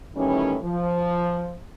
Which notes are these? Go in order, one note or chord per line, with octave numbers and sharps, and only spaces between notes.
A2 D#3 E3 G3 C#4
F3